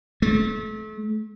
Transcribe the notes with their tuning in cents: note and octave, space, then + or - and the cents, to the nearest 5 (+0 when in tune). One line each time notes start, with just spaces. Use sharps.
A3 -35